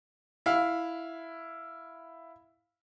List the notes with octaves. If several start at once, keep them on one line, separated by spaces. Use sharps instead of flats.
E4 F5